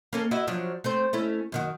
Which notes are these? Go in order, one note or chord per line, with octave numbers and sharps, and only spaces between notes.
A#3 C#4 A4
E4 F#4 D#5
F3 F#3 D4
A3 C4 C5
A3 C#4 E4
F#2 D#3 F#4